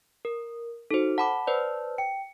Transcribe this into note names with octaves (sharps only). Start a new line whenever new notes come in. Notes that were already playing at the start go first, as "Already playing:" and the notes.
A#4
D#4 F#4 A4 C5
F#5 A5 B5 D6
B4 C5 D5
G5 C#7